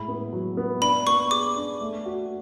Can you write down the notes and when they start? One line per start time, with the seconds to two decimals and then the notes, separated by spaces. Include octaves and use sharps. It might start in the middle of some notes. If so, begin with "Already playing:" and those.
Already playing: A2 G#3 B5
0.08 B3
0.33 F#3
0.57 B3
0.81 D4 B5
1.07 B3 C#6
1.31 G#4 D6
1.56 D4
1.81 A3
2.06 F#4